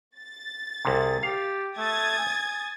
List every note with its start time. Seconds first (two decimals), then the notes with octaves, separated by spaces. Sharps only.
0.18 A6
0.85 C2 C3 G#4
1.23 G4 F5
1.77 A3 D#6 G#6 A6
2.18 G#5